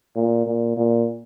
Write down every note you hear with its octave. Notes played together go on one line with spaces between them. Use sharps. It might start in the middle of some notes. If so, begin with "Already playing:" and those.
A#2
A#2
A#2